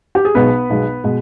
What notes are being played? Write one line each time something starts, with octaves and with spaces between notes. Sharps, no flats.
G4
G#4
B1 B2 G#3 B3 B4
B1 B2 G#3
B2 G#3